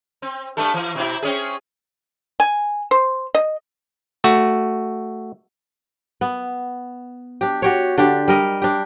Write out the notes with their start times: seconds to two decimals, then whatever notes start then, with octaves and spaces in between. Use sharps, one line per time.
0.22 C4
0.57 G2 A3 A4
0.74 E3
0.95 B2 C4 E4
1.22 C4 C#4 G#4
2.40 G#5
2.91 C5
3.35 D#5
4.24 A3 F#4
6.21 B3
7.41 D4 G4
7.62 F#4 G4 C#5
7.98 D3 D4 G4
8.28 G3 A#4 D#5
8.62 D4 G4